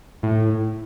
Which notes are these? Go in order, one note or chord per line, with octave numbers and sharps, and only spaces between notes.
A2